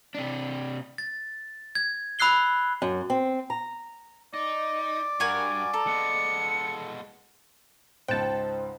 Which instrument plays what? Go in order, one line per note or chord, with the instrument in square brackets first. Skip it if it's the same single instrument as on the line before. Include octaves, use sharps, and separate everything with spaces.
[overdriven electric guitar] C3 D4
[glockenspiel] A6
G#6
B5 E6 F#6 C7 G7
[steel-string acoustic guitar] F#2
C4
A#5
[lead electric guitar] D#4 [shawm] D5
[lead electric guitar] G2 [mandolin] F#4 A#4 G#5
[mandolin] A4 [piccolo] A#5
[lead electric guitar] G#3 B3 [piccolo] C#7
[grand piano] C#2 G#2 [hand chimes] C5 [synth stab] G5 A5